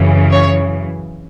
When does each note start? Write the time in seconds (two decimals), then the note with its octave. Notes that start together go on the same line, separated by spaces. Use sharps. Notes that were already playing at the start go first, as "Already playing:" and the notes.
Already playing: F#2 C#3 E3
0.32 C#5